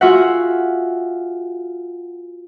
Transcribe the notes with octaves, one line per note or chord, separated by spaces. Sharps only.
F4 F#4 G#4 E5 F#5